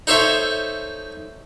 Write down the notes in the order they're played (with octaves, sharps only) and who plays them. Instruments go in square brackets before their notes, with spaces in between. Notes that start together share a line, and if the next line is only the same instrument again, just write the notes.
[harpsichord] D#4 A4 C5 C#5 E5